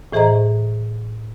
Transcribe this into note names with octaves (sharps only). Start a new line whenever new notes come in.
A2 E3 G#4 C5 D#5 A#5